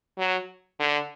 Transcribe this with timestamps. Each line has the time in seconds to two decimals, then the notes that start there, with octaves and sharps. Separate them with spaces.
0.18 F#3
0.80 D3